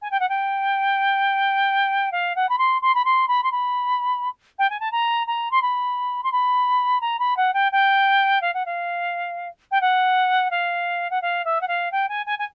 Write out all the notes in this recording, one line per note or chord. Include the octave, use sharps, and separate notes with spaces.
G#5
G5
F#5
G5
F5
F#5
B5
C6
C6
B5
C6
B5
C6
B5
G5
G#5
A5
A#5
A#5
C6
B5
C6
B5
A#5
B5
F#5
G5
G5
F5
F#5
F5
G5
F#5
F5
F#5
F5
E5
F#5
F5
G5
G#5
G#5
G#5